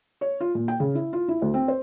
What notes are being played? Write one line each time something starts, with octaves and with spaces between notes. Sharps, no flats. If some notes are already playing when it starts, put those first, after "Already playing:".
C#5
F4
A#2
G5
C#3
E4
F4
E4
D2
C4
C5